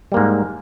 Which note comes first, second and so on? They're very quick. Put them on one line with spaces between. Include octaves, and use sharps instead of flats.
G3 A#3 G#2